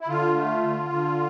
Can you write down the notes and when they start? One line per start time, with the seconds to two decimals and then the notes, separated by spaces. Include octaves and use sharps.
0.01 E4
0.08 D3 F4
0.35 A3
0.63 D3
0.89 D3